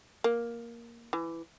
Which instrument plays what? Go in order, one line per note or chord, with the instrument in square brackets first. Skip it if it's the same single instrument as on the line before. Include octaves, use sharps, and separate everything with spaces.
[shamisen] A#3
E3